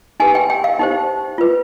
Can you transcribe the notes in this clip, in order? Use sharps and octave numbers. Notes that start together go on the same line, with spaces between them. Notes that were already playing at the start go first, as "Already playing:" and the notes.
D#4 G4 B4 G#5
G5
G5
F5
D#4 G4 C5
F4 B4